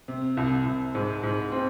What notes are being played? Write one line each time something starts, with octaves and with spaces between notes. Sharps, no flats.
C3
C2
C2
G#2
G#2
C4